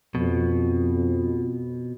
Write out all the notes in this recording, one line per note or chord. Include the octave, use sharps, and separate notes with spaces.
F2 B2